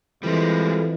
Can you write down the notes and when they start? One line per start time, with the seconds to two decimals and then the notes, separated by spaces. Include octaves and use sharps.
0.23 F2 E3 G3 G#3